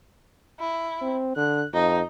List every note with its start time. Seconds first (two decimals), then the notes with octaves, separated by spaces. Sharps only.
0.59 E4
1.02 C4
1.36 D3 F#6
1.73 F2 D#4